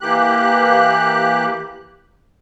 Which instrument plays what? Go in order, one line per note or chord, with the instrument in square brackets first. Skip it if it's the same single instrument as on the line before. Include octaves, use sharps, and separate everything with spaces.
[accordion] E3 A#3 G4 F#6